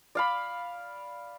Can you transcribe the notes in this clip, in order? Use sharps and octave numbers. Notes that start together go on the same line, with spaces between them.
D5 F5 B5